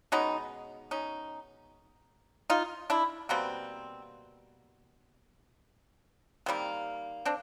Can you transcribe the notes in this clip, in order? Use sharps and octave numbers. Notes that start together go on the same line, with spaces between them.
B2 G#3 B3 C#4 D#4
C#4 D#4
D#4 F4
D4 E4
B2 G3 A#3 C4
D#3 G3 A#3 C4
C4 D4